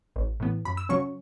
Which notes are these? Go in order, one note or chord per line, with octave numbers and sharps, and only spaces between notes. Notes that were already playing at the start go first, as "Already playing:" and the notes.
A1
A2 E3 B3
F#2 B5
E6
C#3 F#3 C#4 C#6